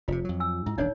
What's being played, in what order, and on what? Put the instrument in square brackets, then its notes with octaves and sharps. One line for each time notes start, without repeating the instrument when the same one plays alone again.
[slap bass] F1 C3 [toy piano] F4
[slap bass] F2 F#3
[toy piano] G#5 E6
[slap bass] G#2 [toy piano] E4
[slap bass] D#1 A1 D4 [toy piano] D#4 C#5 D5